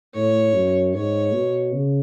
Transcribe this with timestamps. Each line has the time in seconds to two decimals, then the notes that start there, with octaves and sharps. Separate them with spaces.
0.14 A2 C#5
0.53 F#2
0.94 G#2 C#5
1.33 B2
1.72 C#3